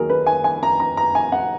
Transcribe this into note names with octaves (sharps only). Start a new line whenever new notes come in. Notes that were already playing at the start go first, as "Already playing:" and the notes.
Already playing: D#2 D#3 F#3 G#4 A#4
B4
G#5
G#5
A#5
A#5
A#5
G#5
F#5